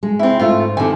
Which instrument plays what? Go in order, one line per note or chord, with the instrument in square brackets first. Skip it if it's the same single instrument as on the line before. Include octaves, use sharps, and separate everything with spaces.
[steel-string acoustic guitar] G#3
[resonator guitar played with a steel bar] C4 E4
[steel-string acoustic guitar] G#2 [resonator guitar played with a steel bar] A3 F4
[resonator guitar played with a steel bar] C3 G#5 [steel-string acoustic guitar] D#3 E4 A4